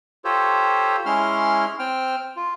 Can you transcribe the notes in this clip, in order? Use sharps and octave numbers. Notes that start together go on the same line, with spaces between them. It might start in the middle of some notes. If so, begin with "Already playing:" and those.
F4 G4 A4 C5 C#5
G#3 C#4 E4 C6 F6
C4 G5 F6
F4